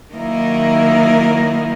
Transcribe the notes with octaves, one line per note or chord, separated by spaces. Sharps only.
D#3 F#3 A#3 D#4 E4 A#4